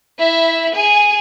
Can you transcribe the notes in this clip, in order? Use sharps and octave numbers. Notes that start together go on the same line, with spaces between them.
E4 E5
G#4 G#5